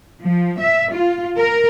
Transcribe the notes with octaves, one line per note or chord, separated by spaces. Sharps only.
F3
E5
F4
A#4